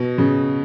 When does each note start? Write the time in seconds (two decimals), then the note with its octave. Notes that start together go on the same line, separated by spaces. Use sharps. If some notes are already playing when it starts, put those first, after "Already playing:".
Already playing: B2
0.18 C#3